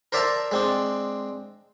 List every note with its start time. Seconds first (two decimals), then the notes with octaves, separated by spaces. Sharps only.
0.12 A#4 C5 D5 E5 A5 A#5
0.51 G#3 C4 D4